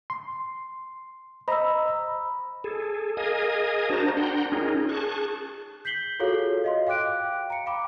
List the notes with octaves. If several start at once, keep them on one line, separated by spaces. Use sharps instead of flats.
C6
C5 D#5 A#5 B5 E6
G#4 A4
G#4 A#4 D#5 F5 G#5 D#6
D4 F#4 A#4 C5 A5 A#5
D4 F#5 G5 A#5 C6
C#4 D#4 F4 G#4 A#4
G#4 A5 C#6 F#6
G6 B6 C7 F#7 G7
F4 F#4 G#4 A4 C#5 F5
D#5 F5 C6
F5 G5 D6 F#6 D7
A#5 C#7
F5 G5 B5 D6